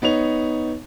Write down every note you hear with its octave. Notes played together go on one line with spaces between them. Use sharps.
B3 D#4 C#5 F7